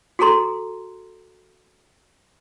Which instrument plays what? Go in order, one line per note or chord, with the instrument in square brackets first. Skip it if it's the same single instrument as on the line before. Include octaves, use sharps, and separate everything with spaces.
[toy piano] F#4 G#4 A4 A#5 C6